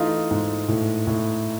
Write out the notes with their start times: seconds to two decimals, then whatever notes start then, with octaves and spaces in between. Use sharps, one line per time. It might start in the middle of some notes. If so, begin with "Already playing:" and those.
Already playing: E3 A3 D#4 F4
0.31 G#2
0.68 A2
1.07 A2